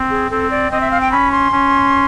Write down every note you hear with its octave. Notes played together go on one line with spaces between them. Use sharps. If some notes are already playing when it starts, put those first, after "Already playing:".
Already playing: C4
G#4
C4 A4
D5
C4 D#5
E5
F5
G5
C#4 B5
C6
C#4